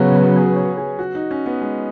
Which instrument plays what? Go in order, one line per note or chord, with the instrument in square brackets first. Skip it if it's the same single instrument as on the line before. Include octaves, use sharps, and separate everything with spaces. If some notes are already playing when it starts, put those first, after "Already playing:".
Already playing: [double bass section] C#3 F#3 B3 [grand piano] C#4 F#4
[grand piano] B4
G#4
C#5
G#4
F#4
D#4
C#4
B3
G#3